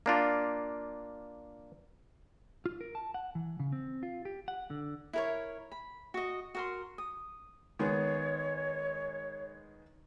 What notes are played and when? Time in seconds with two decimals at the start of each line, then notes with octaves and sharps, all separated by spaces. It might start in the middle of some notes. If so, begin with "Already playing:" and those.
0.06 A#3 D4 F4
2.66 F4
2.81 A#4
2.95 A5
3.14 F#5
3.35 E3
3.60 C#3
3.72 C4
4.03 F4
4.25 G4
4.48 F#5
4.70 D3
5.13 E4 A#4 C#5
5.72 B5
6.14 F#4 D#5
6.55 F#4 A#4 C6
6.98 D#6
7.79 D#3 G#3 B3 C#5